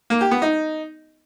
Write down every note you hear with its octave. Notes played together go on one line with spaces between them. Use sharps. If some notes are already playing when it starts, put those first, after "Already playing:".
A#3
G4
B3
D#4